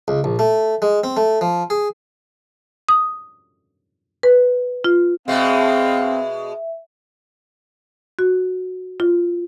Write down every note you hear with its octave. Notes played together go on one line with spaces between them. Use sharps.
C#2
A#1
A3
G#3
C4
A3
F3
G#4
D#6
B4
F4
B2 G#3 C4 E5 F5
F#4
F4